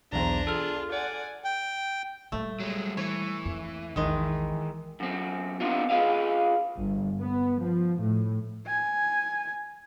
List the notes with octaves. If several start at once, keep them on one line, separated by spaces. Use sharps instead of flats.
B1 E2 D4 C5 A#5
F4 G#4 A4 F6
D5 F#5 G#5
G5
A#2 G3 A3
F#3 G#3
E3 C#5
F2 A#3
A#1 E2 D#3 G#3
F#2 C4
B3 C4 D4 D#4 F4
F4 G#4 B4 D#5 F5
G1
B3
F3
A2
G#5